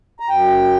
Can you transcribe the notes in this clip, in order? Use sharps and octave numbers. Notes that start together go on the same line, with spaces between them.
A#5
F#2 G5